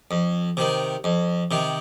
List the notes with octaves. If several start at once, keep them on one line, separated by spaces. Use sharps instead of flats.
F2
C3 D#3
F2
C3 D#3